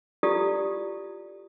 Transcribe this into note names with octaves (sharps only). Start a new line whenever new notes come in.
E4 F4 G4 A4 D5 D#6